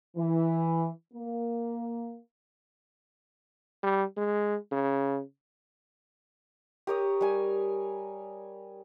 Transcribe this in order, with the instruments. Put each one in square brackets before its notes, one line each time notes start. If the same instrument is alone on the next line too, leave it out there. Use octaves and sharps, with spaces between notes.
[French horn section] E3
A#3
[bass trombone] G3
G#3
C#3
[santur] G4 A#4 C#5 D#6
G3 G#5